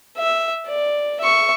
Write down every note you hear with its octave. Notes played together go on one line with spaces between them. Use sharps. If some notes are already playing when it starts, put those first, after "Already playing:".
E5
D5
E5 C#6